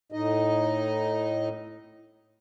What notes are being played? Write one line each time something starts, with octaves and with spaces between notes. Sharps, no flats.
A2 D#4 D#5